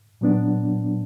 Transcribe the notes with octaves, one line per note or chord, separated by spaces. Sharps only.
A#2 F#3 B3 D4